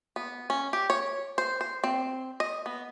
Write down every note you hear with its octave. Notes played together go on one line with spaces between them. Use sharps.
B3
C#4
G4
C#5
C5
C5
C4
D#5
B3